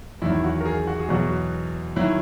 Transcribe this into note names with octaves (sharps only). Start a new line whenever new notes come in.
E2 D#3 F#3 E4
F#4
A#4
G#4
F#4
G#4
E2 B2 F#3 F#4
D#3 F#3 E4